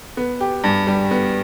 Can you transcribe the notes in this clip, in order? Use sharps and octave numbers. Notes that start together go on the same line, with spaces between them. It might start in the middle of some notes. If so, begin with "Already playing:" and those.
B3
G4
G2
G3
B3